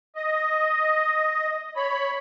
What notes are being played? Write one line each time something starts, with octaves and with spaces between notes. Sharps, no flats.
D#5
C#5 B5